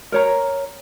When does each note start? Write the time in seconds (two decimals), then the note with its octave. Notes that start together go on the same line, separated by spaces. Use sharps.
0.12 A#4 C#5 A#5